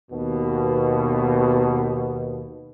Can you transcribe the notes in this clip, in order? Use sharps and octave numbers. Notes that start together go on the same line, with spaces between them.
D#2 B2